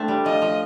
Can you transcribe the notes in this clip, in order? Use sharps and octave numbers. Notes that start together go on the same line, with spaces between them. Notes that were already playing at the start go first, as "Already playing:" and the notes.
Already playing: A3 C4 D4
G3
F3 D#5
F3